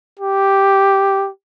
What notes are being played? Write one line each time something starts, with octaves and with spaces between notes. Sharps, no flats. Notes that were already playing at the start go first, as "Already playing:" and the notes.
G4